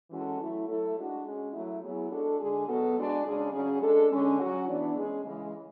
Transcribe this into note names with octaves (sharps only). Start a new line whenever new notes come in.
E3 G#3 C#4 F#4 A4
F#3 A3 E4
F#3 A3 E4 A4
G#3 D4 F#4
G#3 C#4 G#4
F#3 A3 E4
F#3 B3 E4 G#4
G#3 D4 F#4 A4
D3 G#3 D4 G#4
B2 F#3 B3 F#4 A4
G#3 D4 F#4
C#3 G#3 D4 G#4
C#3 F#3 C#4 G#4
G#3 D4 A4
D3 G#3 C#4
F#3 C#4 F#4
E3 B3 D4
G#3 C#4 G#4
C#3 E3 G#3